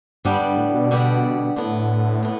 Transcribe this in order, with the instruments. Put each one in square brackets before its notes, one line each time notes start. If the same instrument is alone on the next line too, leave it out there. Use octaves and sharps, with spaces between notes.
[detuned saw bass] G2 [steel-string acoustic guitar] D3 G3 B3 D4 G4
[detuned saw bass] G2
A2
B2
[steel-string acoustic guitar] D3 G3 B3 D4 G4
[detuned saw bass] A2 [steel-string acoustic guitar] D3 B3 E4
[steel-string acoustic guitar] D3 B3